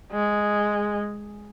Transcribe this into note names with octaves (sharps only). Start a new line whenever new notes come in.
G#3